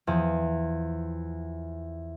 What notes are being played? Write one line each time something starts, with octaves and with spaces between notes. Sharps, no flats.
E2 F3 D#6